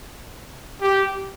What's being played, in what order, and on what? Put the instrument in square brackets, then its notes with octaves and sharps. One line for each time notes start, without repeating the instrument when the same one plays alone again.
[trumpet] G4